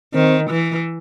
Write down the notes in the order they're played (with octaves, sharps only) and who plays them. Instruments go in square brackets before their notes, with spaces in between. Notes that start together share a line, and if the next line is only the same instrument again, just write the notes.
[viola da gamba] D#3 [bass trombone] C4
[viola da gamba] E3